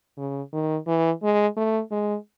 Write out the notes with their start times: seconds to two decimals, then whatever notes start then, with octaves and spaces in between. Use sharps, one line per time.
0.17 C#3
0.53 D#3
0.87 E3
1.23 G#3
1.57 A3
1.91 G#3